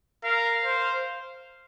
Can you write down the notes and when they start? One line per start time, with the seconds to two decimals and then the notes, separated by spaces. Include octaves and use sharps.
0.24 A#4 F5
0.65 C5